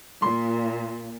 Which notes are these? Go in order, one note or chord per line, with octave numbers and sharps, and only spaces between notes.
A#2 C6